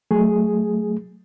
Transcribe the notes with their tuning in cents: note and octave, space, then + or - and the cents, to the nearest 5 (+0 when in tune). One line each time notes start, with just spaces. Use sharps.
F#3 +0 A3 +0 G#4 +0